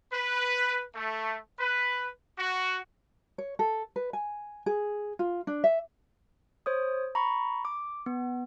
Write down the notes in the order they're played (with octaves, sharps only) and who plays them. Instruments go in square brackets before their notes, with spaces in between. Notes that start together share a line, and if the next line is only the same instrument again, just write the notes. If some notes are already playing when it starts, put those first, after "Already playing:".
[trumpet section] B4
A3
B4
F#4
[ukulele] C#5
A4
B4
G#5
G#4
F4
D4
E5
[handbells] C5 C#5 D#6
A#5 B5 C#6
D6
B3